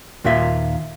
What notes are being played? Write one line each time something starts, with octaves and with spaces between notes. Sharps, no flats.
D#2 A#2 A#3 F4 E5